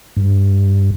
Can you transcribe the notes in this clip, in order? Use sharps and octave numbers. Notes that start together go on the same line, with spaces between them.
G2